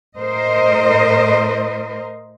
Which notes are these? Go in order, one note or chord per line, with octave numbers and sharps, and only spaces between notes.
A2 A#4 C5 D#5